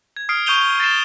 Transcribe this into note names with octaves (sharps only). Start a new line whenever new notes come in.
G#6
D#6 F6 C7 D7
C#6 D#6 G6 D#7 F7 G7
A6 A#6 C7 E7